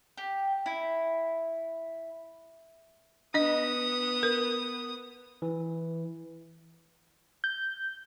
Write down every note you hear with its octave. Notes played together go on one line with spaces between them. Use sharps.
G4
E4
B3 D4 D#5 D#6
A#4
E3
G6